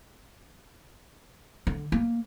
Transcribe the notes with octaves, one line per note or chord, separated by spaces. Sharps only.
D3
A#3